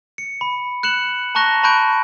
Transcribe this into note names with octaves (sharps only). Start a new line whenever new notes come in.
C#7
B5
F#6 C#7 E7 F#7
A5 A#5 C#6 F#6 A#6
A5 B5 C#6 F#6 G6 D7